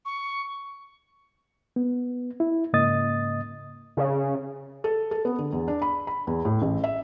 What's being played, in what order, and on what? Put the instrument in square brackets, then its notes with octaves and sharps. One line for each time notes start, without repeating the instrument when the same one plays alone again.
[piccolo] C#6
[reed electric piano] B3
E4
G#2 C#3 A#3 D#5 D#6 A6
[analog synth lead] C#3
[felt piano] A4
A4
B3
D3
E2
D4
B5
B5
E2
A2
A1
E5